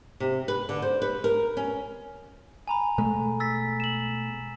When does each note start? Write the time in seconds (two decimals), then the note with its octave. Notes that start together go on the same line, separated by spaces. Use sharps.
0.20 C3
0.48 B4
0.69 D3
0.82 C5
1.02 B4
1.24 A#4
1.57 C#4
2.68 G#5 A#5 B5
2.98 B2 G#3 A3
3.40 E6 A6 B6
3.80 E7 F#7